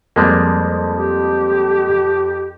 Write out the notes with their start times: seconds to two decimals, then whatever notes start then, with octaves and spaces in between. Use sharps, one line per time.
0.16 F2 G3 G#3 A#3
0.96 G4